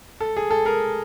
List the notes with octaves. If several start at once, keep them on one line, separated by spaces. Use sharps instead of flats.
A4
G#4
A4
G#4 A#4